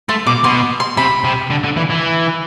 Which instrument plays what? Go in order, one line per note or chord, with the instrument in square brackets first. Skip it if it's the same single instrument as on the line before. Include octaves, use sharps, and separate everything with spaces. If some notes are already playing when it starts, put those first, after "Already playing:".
[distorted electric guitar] A3 [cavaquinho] C6
[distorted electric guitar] B2 [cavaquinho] D6
[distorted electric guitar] B2 [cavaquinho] C6
[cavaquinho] C6
[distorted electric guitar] C3 [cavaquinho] B5
[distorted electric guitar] C3
D3
D3
E3
E3